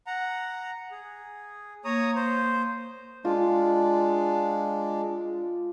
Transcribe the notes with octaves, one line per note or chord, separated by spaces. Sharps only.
F#5 A#5
G#4
A#3 C#5 A#5 D#6
C5
G#3 D4 F4